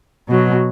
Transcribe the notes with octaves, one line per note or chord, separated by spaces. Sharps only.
B2 F#3